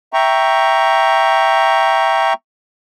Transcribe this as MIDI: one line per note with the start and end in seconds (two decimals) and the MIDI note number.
0.13 2.33 76
0.13 2.33 79
0.13 2.33 82
0.13 2.33 85